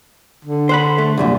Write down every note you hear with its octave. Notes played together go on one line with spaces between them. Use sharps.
D3
C5 F#5 B5
A3
C2 F#2 A#2